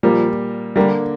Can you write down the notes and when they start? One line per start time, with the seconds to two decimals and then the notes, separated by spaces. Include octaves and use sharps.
0.03 A#2 F3 G3 A#3
0.76 D3 G3 A#3 D4